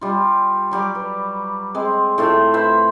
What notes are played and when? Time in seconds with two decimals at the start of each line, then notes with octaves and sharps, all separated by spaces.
0.01 G3 F4
0.71 F#3 G3 D5 D6
0.95 B4
1.75 G#3 C4
2.18 A2 A3 F4 E5
2.54 B4 C5 E5 B5